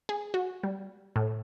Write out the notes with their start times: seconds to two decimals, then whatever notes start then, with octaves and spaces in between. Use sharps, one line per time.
0.09 G#4
0.34 F#4
0.63 G3
1.16 A2